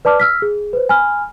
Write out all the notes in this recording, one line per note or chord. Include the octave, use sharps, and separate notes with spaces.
B4 D5 A5 D6 F6
E6 F6 B6
G#4
B4 C5
G#5 B5 F6